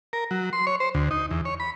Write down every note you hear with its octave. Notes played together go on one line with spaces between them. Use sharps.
A#4
F#3
C6
C#5
C5
D2
D#4
E2
C#5
B5